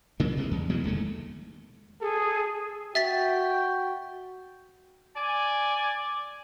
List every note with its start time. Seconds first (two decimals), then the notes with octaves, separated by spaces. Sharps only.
0.20 C#3 F#3 A#3
0.37 C3 G#3
0.51 E2
0.69 B2 E3 F#3 G#3
0.84 D1 D#2 G#3 A3
2.01 G#4 A4
2.95 F#4 E5 G5 A6 B6
5.17 D5 G#5